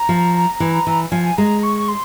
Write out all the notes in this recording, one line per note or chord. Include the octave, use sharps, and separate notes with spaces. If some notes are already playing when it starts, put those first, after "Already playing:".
Already playing: A#5
F3
E3
E3
F3 G#5
G#3 A#5
C#6
C6